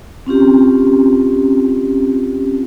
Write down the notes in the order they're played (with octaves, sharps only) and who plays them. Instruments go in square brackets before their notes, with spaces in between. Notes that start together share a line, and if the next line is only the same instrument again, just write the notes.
[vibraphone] C4 C#4 F4 G4